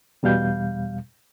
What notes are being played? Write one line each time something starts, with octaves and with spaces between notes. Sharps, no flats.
E2 B2 G3 F5 G6